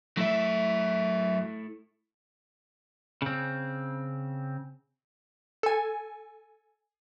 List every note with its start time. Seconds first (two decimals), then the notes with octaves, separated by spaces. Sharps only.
0.17 F#3 A3 E4 E5
3.22 C#3 C4
5.63 A4 G#5